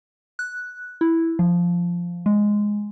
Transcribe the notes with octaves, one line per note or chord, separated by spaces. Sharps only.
F#6
E4
F3
G#3